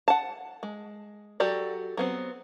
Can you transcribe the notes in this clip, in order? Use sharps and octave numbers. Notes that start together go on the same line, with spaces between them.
F#5 A5
G#3
F#3 F#4 G4 A4 D5
F#3 B3 C4